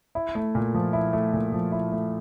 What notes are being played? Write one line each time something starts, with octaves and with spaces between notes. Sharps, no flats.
E4
A3
A#2
F3
E4
A3
A#2
F3
E4
A3